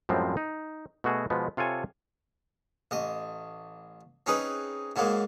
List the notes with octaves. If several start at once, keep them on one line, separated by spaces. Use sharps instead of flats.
F#2 A2 F3 G3 G#3 C4
D#4
B2 A3 F#4 G#4
B2 F3 G#3 B3
C3 F4 A4 C#5 G#5
A1 D#5
C4 C#4 D#4 G#4 B4
G#2 F#3 G#3 A#3